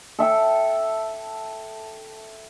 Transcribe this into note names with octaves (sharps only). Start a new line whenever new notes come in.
A4 E5 G5